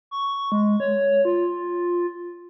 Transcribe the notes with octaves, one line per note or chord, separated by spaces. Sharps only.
C#6
G#3
C#5
F4